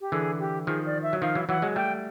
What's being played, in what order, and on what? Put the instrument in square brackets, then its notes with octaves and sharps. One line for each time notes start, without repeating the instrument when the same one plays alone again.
[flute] G4
[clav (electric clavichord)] D3 E3 [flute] G#4
[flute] G4
[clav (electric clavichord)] D#3 F3 [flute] G#4
[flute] D5
E5
[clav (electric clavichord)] F#3
[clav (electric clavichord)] D#3 F3 [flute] F5
[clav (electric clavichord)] E3 F#3
[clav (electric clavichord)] E3 F#3 [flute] F#5
[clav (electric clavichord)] F#3 G#3
[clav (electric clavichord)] G3 A3 [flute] G5